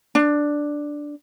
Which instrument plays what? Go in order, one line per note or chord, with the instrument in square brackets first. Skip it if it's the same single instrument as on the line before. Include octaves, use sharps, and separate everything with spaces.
[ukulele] D4